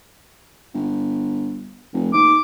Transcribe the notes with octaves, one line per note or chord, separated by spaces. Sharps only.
G1
F1
D#2 D6